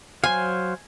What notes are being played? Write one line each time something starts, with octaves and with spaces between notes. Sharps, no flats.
F#3 C5 F5 G#5